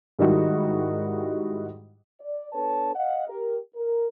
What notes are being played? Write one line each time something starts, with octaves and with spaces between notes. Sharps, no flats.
G#2 D#3 G3 D#4 E4 F#4
D5
B3 D4 A4 B4 C#5 A5
D#5 F5 F#5
G4 A#4
A#4